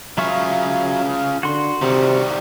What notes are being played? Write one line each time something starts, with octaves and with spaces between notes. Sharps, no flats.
C#3 F#3 F4 E5 C#6
D3 F#4 C6
C3 D#3 G3